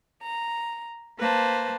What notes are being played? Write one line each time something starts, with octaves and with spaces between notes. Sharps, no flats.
A#5
A#3 B4 C5 A5